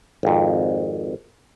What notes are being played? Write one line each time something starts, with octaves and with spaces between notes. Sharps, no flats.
G#1 F2